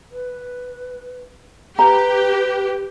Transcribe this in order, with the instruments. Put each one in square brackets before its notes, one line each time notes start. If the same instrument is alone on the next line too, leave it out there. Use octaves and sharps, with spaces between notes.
[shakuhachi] B4
[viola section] G4 [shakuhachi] B4 [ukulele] A#5